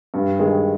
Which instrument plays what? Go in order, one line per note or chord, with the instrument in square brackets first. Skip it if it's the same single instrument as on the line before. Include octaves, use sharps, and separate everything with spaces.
[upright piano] G2
D#3 G#3